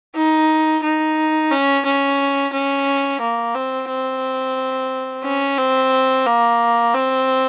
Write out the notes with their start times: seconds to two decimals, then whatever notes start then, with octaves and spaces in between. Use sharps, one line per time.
0.15 D#4
0.83 D#4
1.51 C#4
1.85 C#4
2.53 C#4
3.21 A#3
3.55 C4
3.89 C4
5.24 C#4
5.58 C4
6.26 A#3
6.94 C4